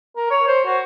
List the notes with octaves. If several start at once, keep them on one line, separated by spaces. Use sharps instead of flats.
A#4
C#5
C5
F#4